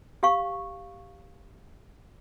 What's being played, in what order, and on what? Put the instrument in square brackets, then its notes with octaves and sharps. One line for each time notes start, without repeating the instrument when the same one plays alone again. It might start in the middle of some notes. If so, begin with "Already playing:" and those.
[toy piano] G4 F5 C#6